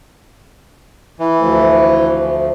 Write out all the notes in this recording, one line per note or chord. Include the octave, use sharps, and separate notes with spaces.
E3
D2 F3 A3